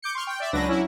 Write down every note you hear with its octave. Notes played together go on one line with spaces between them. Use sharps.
D6 G6 C#7
C6 C#6 F6
G5
D5 E5
C#2 F#3 D4 B4 A#6
F#3 C#4 E4